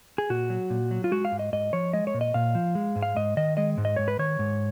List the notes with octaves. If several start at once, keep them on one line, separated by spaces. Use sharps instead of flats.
G#4
A#2 F#4
F#3
A#2
F#3
F4
G#3 F#4
F5
G#2
D#5
G#2 D#5
F3 C#5
G#3 D#5
C#5
A#2
D#5
A#2 F5
F3
G#3
G#2
F5
G#2 D#5
D#3 D#5
G#3 D#5
G#2
D#5
G#2 C#5
B4
D#3 C#5
G#2